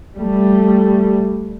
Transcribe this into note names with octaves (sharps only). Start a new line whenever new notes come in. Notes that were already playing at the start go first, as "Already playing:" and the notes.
G3 A3